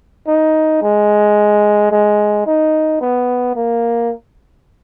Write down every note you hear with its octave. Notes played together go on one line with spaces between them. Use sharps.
D#4
G#3
G#3
D#4
B3
A#3